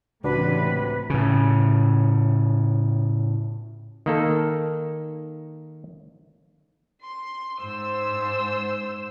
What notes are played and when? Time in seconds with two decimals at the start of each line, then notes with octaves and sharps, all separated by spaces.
0.24 C#2 A2 C3 E3 D4 F#4 B4
1.10 A2 C#3
4.06 D#3 A#3 A4
7.01 C6
7.61 G#2 C5 E6